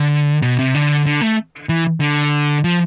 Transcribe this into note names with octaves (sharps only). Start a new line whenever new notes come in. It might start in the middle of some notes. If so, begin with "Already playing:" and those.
Already playing: D3
B2
C3
D3
D3
A3
E3
D3
F3